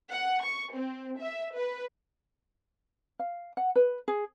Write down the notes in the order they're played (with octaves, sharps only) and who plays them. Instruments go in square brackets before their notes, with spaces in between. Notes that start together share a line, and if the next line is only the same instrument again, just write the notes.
[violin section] F#5
C#6
C4
E5
B4
[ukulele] F5
F#5
B4
G#4